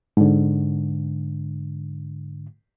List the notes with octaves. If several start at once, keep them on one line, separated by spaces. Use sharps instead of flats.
G#2 D3